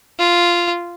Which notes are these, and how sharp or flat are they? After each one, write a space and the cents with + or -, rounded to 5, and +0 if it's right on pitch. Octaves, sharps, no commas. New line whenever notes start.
F4 -5